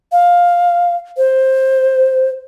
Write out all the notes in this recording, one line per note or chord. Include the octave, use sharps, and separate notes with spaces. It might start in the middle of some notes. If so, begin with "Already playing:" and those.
F5
C5